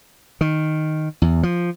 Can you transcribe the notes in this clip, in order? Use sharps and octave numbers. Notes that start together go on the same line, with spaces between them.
D#3
E2
F3